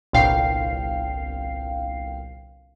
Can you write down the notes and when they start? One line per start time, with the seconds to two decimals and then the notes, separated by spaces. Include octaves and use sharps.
0.13 G1 C2 A#2 F5 G5 C7